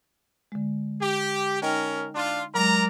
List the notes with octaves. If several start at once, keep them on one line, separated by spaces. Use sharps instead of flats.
D3 G#3
G4
C#4 D#4 A#4 D#5 G5
D4 F4
F#3 G#3 A#4 D5 A#5